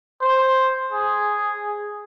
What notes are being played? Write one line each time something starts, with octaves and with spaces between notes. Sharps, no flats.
C5
G#4